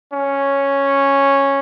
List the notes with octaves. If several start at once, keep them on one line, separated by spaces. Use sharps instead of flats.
C#4